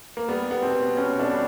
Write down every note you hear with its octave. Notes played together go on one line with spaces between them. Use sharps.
A#3
G3 B3
B3
B2 C4
B2 C#4
D4
G3